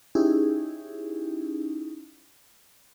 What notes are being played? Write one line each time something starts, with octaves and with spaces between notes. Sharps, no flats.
C#4 D#4 E4 G4 G#4